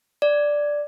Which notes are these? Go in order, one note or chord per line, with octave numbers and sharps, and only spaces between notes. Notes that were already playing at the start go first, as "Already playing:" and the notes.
D5